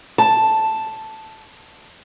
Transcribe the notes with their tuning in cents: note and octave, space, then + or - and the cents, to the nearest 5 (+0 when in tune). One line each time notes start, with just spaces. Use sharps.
A5 +0